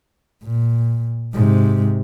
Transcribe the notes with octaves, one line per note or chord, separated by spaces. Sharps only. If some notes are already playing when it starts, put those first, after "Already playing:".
A#2
G#2 C3